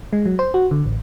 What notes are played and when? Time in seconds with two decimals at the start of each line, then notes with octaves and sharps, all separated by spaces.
0.13 G#3
0.26 F#3
0.39 C5
0.54 F#4
0.71 D3
0.86 A1